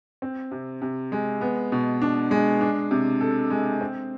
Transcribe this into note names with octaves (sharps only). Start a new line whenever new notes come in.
C4
C3
C3
G#3
B3
B2
D4
G#3
D4
C3
A4
G#3
C4